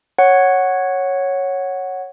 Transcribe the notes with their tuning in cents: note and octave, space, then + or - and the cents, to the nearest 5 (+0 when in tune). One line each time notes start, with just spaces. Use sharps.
C#5 -5 F#5 +0